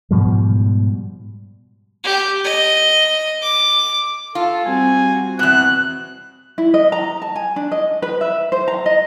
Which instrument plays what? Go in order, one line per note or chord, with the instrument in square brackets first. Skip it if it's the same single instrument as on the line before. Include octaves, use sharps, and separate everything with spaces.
[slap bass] G#2 B2 F3 G3
[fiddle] G4
D#5
D6
[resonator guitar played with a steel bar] F4 [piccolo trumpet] A4
[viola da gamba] G3 C4 F#4 [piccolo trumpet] G#5
[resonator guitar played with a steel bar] E2 B2 [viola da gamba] C4 [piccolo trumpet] F#6
[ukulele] E4
D#5
A#5
A5
G#5
D4
D#5
B4
E5
C5
A#5
D#5